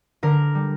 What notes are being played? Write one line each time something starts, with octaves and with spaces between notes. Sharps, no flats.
D3 A#4
G3